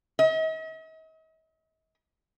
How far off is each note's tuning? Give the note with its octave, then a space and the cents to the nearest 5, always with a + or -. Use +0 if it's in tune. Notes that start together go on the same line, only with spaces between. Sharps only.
D#5 +45